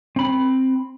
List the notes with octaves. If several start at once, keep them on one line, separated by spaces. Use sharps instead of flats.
C4 B5